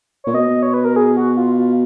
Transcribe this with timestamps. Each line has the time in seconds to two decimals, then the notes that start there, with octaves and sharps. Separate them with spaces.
0.24 A#2 C#5
0.35 B2 D#5
0.63 C#5
0.74 B4
0.85 A#4
0.96 G#4
1.17 F#4
1.37 F4
1.57 F4